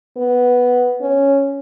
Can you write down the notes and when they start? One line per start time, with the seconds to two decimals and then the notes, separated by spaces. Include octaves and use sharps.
0.17 B3
1.01 C#4